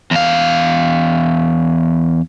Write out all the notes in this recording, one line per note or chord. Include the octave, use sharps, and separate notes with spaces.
E2 F5